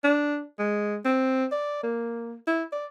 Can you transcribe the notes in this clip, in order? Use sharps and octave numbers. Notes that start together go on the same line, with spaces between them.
D4
G#3
C4
D5
A#3
E4
D5